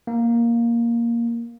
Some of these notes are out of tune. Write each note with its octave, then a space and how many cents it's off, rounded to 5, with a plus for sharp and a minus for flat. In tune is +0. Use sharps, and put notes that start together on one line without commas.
A#3 +5